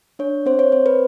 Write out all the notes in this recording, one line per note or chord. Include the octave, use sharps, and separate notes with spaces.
D4 C#5
C4 C5
C#5
C4 C5
B4